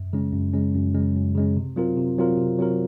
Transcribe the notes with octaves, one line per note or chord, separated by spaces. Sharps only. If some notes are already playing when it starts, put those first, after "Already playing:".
Already playing: F#2
C#3 G#3 C#4
F#2
C#3 G#3 C#4
F#2
C#3 G#3 C#4
F#2
C#3 G#3 C#4
C3
F#3 C4 F4 A#4
C3
F#3 C4 F4 A#4
C3
F#3 C4 F4 A#4